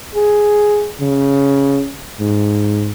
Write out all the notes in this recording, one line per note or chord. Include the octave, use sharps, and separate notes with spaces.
G#4
C#3
G#2